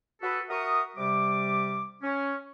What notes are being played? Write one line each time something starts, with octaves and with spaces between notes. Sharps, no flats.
F#4 G#4 A4 B4
F#4 A#4 E5 A#5 C#6 D#6
C3 G3 D6
C#4